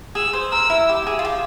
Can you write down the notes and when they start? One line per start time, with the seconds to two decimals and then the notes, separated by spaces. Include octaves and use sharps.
0.15 G#4 E6
0.33 C5
0.52 A#4 E6
0.70 E4
0.89 G4
1.07 G#4
1.19 F4
1.25 G4